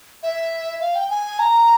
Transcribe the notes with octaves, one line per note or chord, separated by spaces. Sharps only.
E5
F5
G5
G#5
A#5